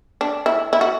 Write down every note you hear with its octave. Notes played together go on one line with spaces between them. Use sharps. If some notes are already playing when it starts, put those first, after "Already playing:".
D4
E4
E4
F#4